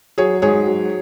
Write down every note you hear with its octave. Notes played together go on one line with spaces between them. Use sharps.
F#3 G#4 C#5
G#2 G#4 C#5
F#3